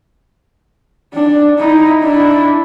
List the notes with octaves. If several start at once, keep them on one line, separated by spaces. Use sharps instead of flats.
D4
D#4 E4
D4 E4